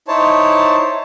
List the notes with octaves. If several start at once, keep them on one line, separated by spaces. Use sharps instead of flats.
D#4 E4 C5 C#5 A5